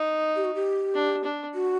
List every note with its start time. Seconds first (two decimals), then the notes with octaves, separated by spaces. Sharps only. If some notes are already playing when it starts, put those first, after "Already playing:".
Already playing: D#4
0.36 G4
0.45 F#4
0.55 G4
0.95 D4
1.24 D4
1.55 F#4